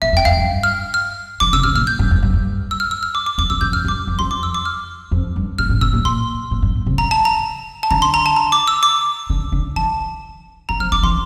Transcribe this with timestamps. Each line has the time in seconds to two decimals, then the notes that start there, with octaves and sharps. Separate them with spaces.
0.02 A2 E5
0.13 F2
0.17 G5
0.25 F2 F5
0.37 G2
0.63 F6
0.94 F6
1.40 E3 D6
1.53 D3 E6
1.63 C3 F6
1.75 A#2 F6
1.87 G6
1.99 G2
2.11 F2
2.22 G2
2.33 G2
2.71 E6
2.80 F6
2.91 E6
3.03 F6
3.15 D6
3.26 D6
3.38 F2 D6
3.50 E2 E6
3.61 G2 G6
3.72 F2 F6
3.85 G2
3.88 D6
4.07 F2
4.19 F2 C6
4.31 D6
4.43 E6
4.54 D6
4.65 F6
5.11 F2
5.36 G2
5.58 A2 F6
5.69 A2
5.81 A2 E6
5.93 A#2
6.05 A#2 C6
6.51 A2
6.62 G2
6.75 A#2
6.86 C3
6.98 E3 A#5
7.11 A5
7.25 A#5
7.83 A5
7.91 D3 A#5
8.02 C6
8.14 A#5
8.26 A5
8.36 A#5
8.52 D6
8.68 E6
8.83 D6
9.30 D3
9.52 D3
9.76 E3 A5
10.69 E3 A#5
10.80 F3 F6
10.92 E3 D6
11.03 E3 C6